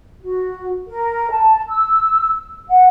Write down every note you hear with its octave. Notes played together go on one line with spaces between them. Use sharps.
F#4
A#4
A5
E6
F#5